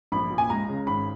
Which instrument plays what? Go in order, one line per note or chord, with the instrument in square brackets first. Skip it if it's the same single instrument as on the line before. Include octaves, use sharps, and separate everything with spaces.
[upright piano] A#1 B5
A#2
G#5
C#2 A#5
C#3
G#1 B5